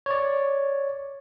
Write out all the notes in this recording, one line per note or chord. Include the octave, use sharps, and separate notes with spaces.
C#5 D5